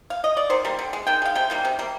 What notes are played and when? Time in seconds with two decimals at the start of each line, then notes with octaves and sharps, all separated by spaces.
0.10 F5
0.24 D#5
0.37 D5
0.50 D#3 C5
0.65 G3 A#3
0.79 D3
0.93 G#3
1.07 D#3 G5
1.22 G#3 F5
1.35 C3 G5
1.50 D#3 G3 A#3
1.65 C3
1.79 G3 A#3